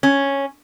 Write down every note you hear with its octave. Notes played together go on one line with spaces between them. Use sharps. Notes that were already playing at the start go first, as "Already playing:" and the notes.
C#4